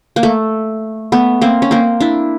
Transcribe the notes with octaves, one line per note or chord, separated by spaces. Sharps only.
A#3
A3
A3 B3
A#3 C4
C#4
A#3 C4
D4 E4